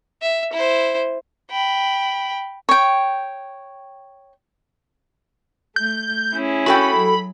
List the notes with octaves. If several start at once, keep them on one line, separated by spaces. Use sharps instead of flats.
E5
E4 C5
G5 B5
C#5 G5
A3 G6
C#4 E4 G#4
F#4 A4 G5 B5
F#3